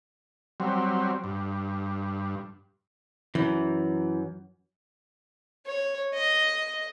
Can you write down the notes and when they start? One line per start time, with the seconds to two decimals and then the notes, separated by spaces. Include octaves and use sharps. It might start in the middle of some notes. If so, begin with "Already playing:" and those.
0.60 F#3 G3 C4
1.24 G2
3.35 F#2 E3
5.66 C#5
6.13 D#5